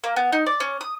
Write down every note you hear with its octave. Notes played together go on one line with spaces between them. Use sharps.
A#3
B3
D#4
D5
C#4
D#6